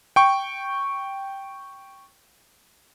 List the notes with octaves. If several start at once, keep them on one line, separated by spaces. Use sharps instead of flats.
G5 C#6